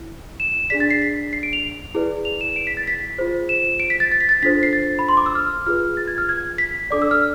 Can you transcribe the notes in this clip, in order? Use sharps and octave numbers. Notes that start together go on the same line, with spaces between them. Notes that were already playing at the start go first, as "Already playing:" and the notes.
Already playing: E4
E7
D4 G#4 D5 B6
A6
C7
B6
C7
D7
F7
E4 G#4 B4 D5
F7
E7
D7
B6
A6
B6
F4 G#4 C5
E7
D7
B6
A6
A6
B6
A6
D4 F4 A4 C5 B6
C7
A6
B5
C6
D6
E6
F6
F4 G#4 B4 F6
A6
G#6
F6
G#6
B6
D4 A4 D5 D6
E6
F6